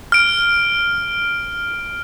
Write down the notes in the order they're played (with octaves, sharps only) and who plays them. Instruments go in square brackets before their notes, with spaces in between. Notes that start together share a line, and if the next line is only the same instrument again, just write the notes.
[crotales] F6 D7